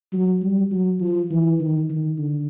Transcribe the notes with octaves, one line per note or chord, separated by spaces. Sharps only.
F#3
G3
F#3
F3
E3
D#3
D#3
D3